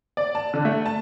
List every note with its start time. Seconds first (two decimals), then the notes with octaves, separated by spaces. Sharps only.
0.17 D5
0.35 A5
0.54 D3
0.65 A3
0.86 A5